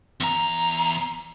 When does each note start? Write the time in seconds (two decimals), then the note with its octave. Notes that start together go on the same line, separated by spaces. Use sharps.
0.20 E2 A#5